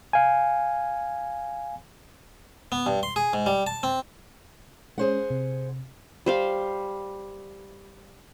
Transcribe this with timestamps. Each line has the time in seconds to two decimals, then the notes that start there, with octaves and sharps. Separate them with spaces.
0.13 F5 G#5
2.72 B3
2.86 G2
3.03 C6
3.16 G#4
3.33 G#2
3.46 G3
3.67 A5
3.83 C4
4.98 G#3 C#4 G#4 C5 F#5
5.30 C3
6.26 G3 C5 F5